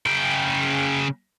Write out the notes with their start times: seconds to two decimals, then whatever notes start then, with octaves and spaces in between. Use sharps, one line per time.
0.06 C#3 G5